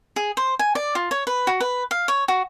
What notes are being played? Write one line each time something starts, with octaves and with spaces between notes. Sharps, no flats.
G#4
C5
G#5
D5
F4
C#5
B4
F#4
B4
F5
C#5
F#4